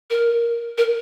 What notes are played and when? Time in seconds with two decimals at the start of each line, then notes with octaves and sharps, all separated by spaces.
0.10 A#4
0.78 A#4